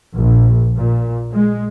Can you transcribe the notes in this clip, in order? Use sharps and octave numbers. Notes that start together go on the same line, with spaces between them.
A#1
A#2
G#3